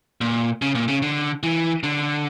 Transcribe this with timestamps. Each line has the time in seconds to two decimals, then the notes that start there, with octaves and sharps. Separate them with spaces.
0.21 A#2
0.62 C#3
0.75 A#2
0.88 C#3
1.02 D3
1.43 E3
1.83 D3